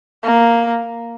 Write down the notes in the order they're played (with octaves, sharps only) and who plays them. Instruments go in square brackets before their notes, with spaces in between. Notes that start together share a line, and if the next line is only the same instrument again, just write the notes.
[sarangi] A#3